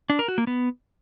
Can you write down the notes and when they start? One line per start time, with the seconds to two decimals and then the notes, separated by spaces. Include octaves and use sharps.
0.10 D4
0.19 A#4
0.28 F#4
0.38 A#3
0.47 B3